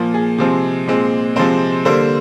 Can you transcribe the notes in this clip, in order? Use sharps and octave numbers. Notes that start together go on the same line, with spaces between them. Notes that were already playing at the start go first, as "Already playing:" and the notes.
Already playing: A#2 F3 A#3
G#4
C3 F3 G#3 C4
A#2 G#3 C4
C3 F3 G#3 C4 C5
D3 G3 A#3 C5